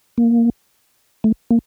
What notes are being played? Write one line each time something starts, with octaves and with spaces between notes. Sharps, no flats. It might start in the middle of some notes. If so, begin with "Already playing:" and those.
A#3
A3
A#3